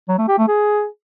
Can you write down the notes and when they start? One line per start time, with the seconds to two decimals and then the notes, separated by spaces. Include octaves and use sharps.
0.09 F#3
0.19 A3
0.28 G4
0.38 A3
0.48 G#4